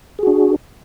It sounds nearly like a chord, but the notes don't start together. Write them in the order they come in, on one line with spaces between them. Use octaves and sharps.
G#4 F#4 D4